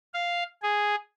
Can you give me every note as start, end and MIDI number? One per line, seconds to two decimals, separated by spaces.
0.14 0.43 77
0.62 0.95 68